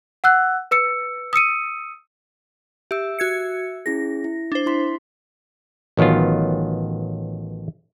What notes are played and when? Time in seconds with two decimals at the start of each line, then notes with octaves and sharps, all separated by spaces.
0.24 F#5 E6 F#6
0.71 B4 E6 C#7
1.33 D#6 E6 C#7 D#7
2.91 G4 E5 E6
3.19 F#4 G#6 C#7
3.86 C#4 E4 G#4 A#6
4.24 E4
4.52 D4 C5
4.66 E4 C6 B6
5.97 A1 D#3 F#3 B3 F4